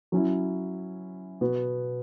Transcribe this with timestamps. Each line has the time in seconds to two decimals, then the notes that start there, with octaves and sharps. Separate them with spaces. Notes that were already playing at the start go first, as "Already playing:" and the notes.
0.12 F#3 C#4 E4
1.41 B2 B3 F#4